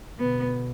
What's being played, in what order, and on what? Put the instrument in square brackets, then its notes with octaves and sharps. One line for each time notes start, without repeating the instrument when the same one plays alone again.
[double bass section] B2 D3 [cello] B3